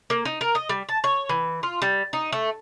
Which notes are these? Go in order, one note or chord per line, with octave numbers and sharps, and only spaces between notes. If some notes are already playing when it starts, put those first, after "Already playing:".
A#3
D#4
A#4
D#5
G3
A5
C#5
E3
F4
G3
D#4
A3